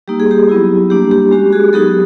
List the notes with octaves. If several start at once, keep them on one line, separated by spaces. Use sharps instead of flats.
G3 A#3 D#4 G4
G#4
G4
F#3 B3 E4
G3 A#3 D4 G4
G4
G#3 C#4 F#4 G4
F#4 G#4
F#3 B3 D#4 F#4 G4 A4